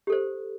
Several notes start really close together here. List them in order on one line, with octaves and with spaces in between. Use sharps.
G4 A4 C5